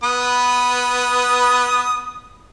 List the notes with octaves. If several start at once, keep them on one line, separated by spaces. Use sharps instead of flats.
B3 B4 D#6